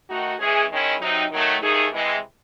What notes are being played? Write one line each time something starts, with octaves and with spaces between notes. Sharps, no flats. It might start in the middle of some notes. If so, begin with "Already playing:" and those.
D#3 A3 D#4 F#4
E3 G#3 C#4 G#4
D#3 G#3 C#4 E4
C3 F#3 C4 D#4
D#3 F#3 A3
D#2 D#3 A3 D#4 G#4
C3 E3 G#3